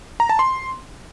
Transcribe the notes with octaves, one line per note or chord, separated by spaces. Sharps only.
A#5
A5
C6